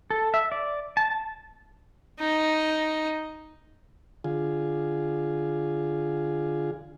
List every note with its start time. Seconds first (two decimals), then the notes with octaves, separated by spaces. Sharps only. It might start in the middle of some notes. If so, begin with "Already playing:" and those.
0.10 A4
0.34 E5
0.52 D5
0.97 A5
2.21 D#4
4.24 D3 F4 G#4